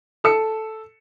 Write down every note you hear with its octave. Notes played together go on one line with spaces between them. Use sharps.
A4 E6 C#7